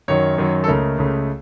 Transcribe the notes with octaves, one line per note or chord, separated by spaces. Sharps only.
F#2 D#3 F#3 C#5
F#2 D#3 F#3
A4
C#2 C#3 A3 A#4
C#2 C#3 A3